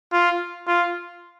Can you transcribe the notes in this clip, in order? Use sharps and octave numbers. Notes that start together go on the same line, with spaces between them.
F4
F4